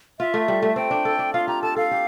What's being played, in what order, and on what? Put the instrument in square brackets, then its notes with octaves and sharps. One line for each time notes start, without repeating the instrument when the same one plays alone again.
[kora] F4 [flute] E5
[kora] A3
G3
A3
[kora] C4 [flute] G5
[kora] D4
A4
D4
[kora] F4 [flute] F5
[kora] G4 [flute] A#5
[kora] A4 [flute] A5
[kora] A4 [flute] F5
[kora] G4